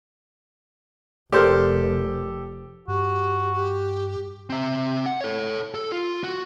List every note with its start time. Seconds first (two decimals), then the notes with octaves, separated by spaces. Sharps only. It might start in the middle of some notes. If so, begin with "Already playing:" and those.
1.32 F1 G4 A4 A#4 C5 D5
2.88 G2 F#4 G4
3.53 G4
4.50 C4 E5
5.06 F#5
5.21 A4 C#5
5.74 A4
5.92 F4
6.24 F#4